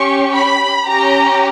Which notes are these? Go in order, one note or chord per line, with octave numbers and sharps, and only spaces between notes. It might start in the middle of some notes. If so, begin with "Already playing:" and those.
Already playing: C#4 G4 C#6
B5
C#4 G4 A#5